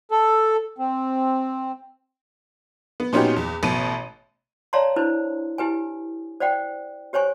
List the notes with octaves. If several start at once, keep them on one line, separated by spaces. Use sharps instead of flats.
A4
C4
B3
A#2 B3 C#4 D#4 F#4 G4
E2
A1 B2 D#7
C#5 D5 F5 A5 A#5 C6
D4 E4 B4 C5
E4 G4 B4 G#5
C5 D5 F#5 G5
G4 C5 C#5 G#5 C#6